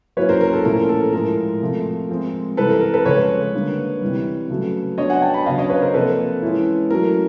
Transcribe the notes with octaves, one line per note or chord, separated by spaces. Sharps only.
F#3 A#3 C#4 E4 B4 C#5
A#4 C5
A#4
A4
A#2 F3 A3 C#4 E4 A#4
A4
A2 F3 G#3 A#4
C3 F3 A3
F3 G#3 C4
C3 E3 G3 A4 B4
A#4
A#4
A4 B4
C#3 F3 G#3 B4 C#5
D3 G3 A#3 D#4
C3 E3 G3
C#3 F#3 A3
F#3 B3 D4 C#5 D#5
F#5 G#5
G5 A5
A5 B5
C#3 F#3 B3 D4 D#5 F5
C#5 D#5
B4 C#5
A#4 C5
C3 F3 A#3 A4 B4
E3 G#3 C#4 E4
F#3 A3 C#4 E4 A#4